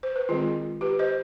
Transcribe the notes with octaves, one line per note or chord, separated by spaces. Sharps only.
C5
B4
D#3 G#3 C4 F4 G#4
G4 B4
C5 D#5